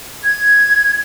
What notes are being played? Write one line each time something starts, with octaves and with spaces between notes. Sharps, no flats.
G#6